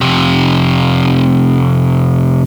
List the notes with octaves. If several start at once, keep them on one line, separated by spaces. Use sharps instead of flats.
F2 C3